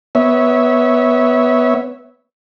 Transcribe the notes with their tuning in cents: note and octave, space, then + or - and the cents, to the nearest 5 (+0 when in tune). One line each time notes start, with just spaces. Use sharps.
B3 +0 C#5 +0 E5 -20